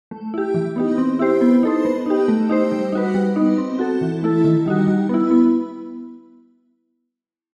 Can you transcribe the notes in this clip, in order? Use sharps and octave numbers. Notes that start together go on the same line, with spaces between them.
A3
E4 G4
E3
B3 D#4 G4
C4
E4 G4 C5
B3
D#4 A4 C5
B3
D#4 G4
A3
D#4 G4 C5
G3
D#4 F#4 B4
G3
B3 D#4
C4
F#4 A4
E3
A3 E4 A4
D#3
G3 D#4 F#4
G3
B3 E4
B3